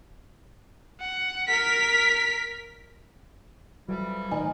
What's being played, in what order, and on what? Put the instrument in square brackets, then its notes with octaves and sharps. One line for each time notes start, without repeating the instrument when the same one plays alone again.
[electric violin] F#5
A#4 B6
[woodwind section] F2 E3 G3 [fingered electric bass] F#3
[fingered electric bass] A2 D#3 [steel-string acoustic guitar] F3 D#4 [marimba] G#5